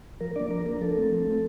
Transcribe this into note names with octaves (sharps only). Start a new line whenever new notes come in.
F3 A#4
A#3 D4 D5
F3 A#4
A#3 D4 A#4
F3 A4
A3 C4
F3
A3 C4